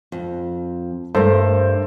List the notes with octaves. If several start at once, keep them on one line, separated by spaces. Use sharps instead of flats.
F2
G2 A3 A4 A#4 C5